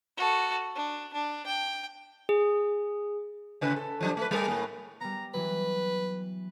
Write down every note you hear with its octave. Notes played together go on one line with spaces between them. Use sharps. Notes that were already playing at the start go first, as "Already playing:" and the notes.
F#4 A4
D4
D4
G5
G#4
A2 C#3 B4
A4
F3 F#3 D4
A3 B4
G3 G#4 A#4
A2 A#3
G3 B3 A#5
E3 F#3 B4